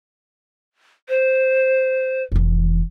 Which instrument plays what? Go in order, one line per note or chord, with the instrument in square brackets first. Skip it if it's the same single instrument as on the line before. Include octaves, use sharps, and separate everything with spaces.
[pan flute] C5
[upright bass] F1 E3